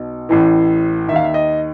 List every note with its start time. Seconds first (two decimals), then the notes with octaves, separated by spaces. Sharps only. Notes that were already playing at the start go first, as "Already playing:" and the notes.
Already playing: B1 B2
0.29 A1 A2 E3
1.08 D#3 E5
1.13 D#2 F5
1.24 E5
1.34 D#5